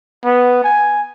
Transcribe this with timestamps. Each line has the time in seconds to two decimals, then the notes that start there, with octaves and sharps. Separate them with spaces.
0.25 B3
0.64 G#5